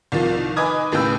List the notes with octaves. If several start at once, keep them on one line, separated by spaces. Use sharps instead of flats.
C2 D#3 F3
B4 D#5 G#5 D6 D#6 G#6
D#2 A2 C#3 B4 G5 E6